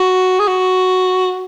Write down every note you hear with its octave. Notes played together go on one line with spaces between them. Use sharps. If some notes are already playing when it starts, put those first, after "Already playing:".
Already playing: F#4
G#4
F#4